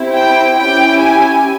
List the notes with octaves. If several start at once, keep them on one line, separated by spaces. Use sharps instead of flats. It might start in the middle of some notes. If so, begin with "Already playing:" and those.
Already playing: C4 E4 G4
G5
C#4 E4 G4 G5
G#5